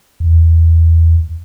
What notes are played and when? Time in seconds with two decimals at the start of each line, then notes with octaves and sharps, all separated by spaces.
0.20 E2